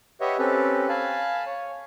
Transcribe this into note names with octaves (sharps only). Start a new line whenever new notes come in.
G4 B4 C#5 D#5 E5 F#5
C4 C#4 G4 A4 B4
F5 G#5 A5 B5
C#5